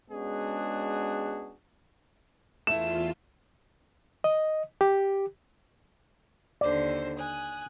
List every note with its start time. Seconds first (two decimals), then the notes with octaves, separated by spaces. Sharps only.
0.11 G#3 B3 C#4 D4 F#4 G#4
2.67 E2 A3 E4 F4 E7
4.24 D#5
4.81 G4
6.61 D#2 D3 C5 D5
7.18 G#5 D#6 F#6